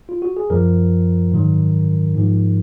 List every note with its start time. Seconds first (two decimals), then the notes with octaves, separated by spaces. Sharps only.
0.09 F4
0.22 F#4
0.37 G#4
0.50 F#2 F3 A#4
1.32 G#2 D#3 F#3
2.15 G#2 F3